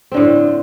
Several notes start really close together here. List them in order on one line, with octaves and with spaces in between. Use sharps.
C4 D3 A2